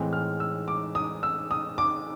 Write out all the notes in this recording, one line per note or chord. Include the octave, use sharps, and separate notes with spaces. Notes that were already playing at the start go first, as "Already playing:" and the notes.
Already playing: A2 E3 G#3 C4
F6
E6
D6
D#6
E6
D#6
D6